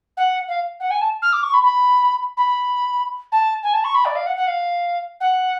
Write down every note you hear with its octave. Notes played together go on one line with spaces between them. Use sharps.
F#5
F5
F#5
G#5
A5
F6
D6
C#6
B5
B5
B5
A5
G#5
A5
C#6
B5
D5
F5
F#5
F#5
F5
F#5